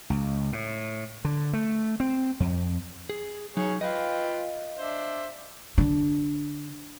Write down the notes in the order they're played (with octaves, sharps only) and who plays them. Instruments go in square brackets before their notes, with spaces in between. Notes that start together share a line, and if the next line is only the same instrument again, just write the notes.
[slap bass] C#2
A2
D3
A3
C4
F2
[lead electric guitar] G#4
[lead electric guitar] F#3 D#4 [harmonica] G#4 C#5
[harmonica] F4 B4 G5 [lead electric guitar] D#5 F5
[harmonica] D4 C5 E5
[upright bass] D3 D4